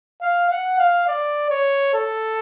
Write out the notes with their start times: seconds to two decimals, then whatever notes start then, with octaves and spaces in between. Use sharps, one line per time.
0.21 F5
0.50 F#5
0.79 F5
1.08 D5
1.51 C#5
1.94 A4